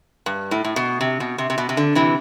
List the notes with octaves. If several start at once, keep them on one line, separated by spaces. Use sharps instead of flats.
G2
A2
A2
B2
C3
B2
C3
C3
B2
C3
D3
C3 E3